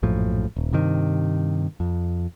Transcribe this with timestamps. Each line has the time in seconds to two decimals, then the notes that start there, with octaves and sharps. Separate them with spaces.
0.03 A#1 F#2 A2 F3
0.56 D#1
0.73 G2 C3 D#3
1.80 F2